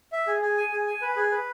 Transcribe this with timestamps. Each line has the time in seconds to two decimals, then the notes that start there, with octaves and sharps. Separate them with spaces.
0.12 E5
0.27 G#4
0.42 G#4
0.57 G#5
0.72 G#4
0.87 G#5
1.02 B4
1.16 G#4
1.32 B4